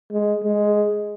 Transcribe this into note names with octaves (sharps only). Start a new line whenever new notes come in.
G#3
G#3